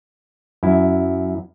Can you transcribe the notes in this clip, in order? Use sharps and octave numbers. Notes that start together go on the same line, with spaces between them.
F#2 E4